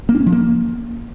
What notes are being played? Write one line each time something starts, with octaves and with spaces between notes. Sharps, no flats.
A#3
D4
C#4
F3
A#3